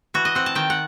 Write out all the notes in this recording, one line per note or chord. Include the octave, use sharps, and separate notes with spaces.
E3 F#4
D#5
C4 F#5
A5
D#3 G5
F#5